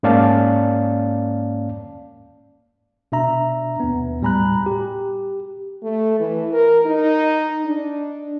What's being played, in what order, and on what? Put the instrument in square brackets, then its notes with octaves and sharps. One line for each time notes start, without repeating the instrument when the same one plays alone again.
[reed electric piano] G#2 A#3 C#4 D5 F5 A5
[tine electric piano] B2 D4 E5 A#5
D#2 B3
A2 G3 G#5 A#5 B5 F#6
G4
[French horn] A3
E3
A#4
D#4
D4